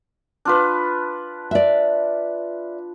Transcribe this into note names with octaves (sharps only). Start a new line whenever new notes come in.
D4 F4 B4
D5 E5